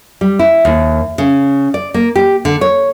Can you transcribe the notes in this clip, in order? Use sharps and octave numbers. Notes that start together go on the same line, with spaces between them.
G3
E4
D#2
C#3
D5
A#3
G4
D3
C#5